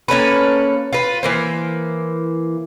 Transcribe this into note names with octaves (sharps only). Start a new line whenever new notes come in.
A#3 C#4 A4 B4
F4 B4
E3 A#3 C5